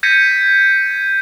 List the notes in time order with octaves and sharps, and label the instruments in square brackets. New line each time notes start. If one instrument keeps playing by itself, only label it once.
[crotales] G6 G#6 A#6 B6 C#7 D#7